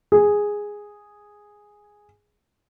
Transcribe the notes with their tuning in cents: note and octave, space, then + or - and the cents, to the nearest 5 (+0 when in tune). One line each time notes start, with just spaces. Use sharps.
G#4 -5